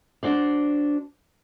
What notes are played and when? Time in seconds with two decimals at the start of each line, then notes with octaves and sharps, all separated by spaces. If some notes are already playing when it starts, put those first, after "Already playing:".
0.23 D4 F#4 C5 D5